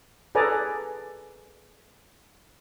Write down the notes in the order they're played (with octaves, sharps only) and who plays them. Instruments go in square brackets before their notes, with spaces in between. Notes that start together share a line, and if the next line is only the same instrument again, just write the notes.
[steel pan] G#4 A4 B4 D5 G#5 A#5